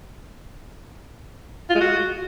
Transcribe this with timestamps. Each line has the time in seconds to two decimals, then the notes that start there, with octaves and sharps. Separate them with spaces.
1.70 F4
1.75 G#3
1.80 F#4